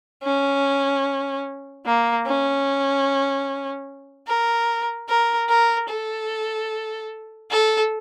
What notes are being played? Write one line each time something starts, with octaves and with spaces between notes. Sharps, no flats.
C#4
A#3
C#4
A#4
A#4
A#4
A4
A4